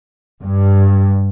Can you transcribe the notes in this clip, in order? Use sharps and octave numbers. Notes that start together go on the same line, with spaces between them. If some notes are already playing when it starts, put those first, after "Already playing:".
G2